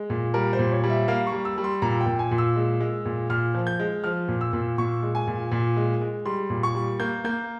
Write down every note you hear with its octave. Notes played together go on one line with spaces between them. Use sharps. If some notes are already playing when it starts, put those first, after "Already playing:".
Already playing: G#3
A#2
G3 A#4
C5
A#2
C#5
G3
E5
A#3 F5
C#6
G3
E6
G3
C6
A#2 A#5
G5
A#2
G#5
A#2
E6
G#3
G#3
A#2
A#2 F6
F3
G6
G#3
F3 F6
A#2
E6
A#2
A#2 C#6
G#3
G#5
A#2
A#2
G#3
G#3
G3 C6
A#2
C#6
G3
A#3 G6
A#3 G6